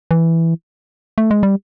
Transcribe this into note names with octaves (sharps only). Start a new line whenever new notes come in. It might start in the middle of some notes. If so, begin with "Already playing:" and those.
E3
A3
G#3
G3